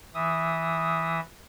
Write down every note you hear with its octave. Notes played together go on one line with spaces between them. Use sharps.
E3 E5 D#6